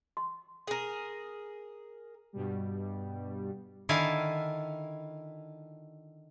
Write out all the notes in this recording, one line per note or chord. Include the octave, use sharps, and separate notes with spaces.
C6
G#4 A#4
G2 B2 G3
D3 D#3 E4 F4 F5 G#5